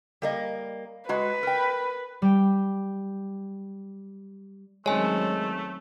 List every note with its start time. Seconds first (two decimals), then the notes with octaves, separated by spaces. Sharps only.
0.22 G3 A#3 D#5
1.09 G#3 F#4 B4 A#5
1.43 A#4 G5
2.22 G3 G5
4.86 F#2 D#3 G#3 A3 C4 C#5 G#5